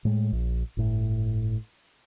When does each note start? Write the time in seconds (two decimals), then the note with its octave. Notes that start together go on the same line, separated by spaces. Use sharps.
0.05 A2 G#3
0.32 A#1
0.77 G1 A2